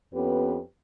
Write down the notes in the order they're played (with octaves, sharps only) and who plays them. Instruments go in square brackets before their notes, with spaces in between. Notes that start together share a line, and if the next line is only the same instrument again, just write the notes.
[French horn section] F2 B3 C#4 G4 B4